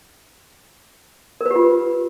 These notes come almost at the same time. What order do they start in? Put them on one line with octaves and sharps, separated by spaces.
A#4 B4 G4 F4